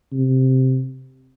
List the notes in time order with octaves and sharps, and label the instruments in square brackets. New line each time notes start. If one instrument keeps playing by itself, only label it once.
[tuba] C3